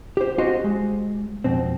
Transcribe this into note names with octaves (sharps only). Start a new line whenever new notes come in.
G4 C5
F#4 G4 C5 D#5 F5
G#3
F2 B2 C4